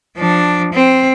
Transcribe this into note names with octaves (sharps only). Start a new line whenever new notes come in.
F3 D4
C4